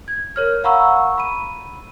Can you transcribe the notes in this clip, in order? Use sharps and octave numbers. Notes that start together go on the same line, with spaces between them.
G#6
A#4 C#5 F6
F5 F#5 A#5 B5 C#6 E6
B5 D#7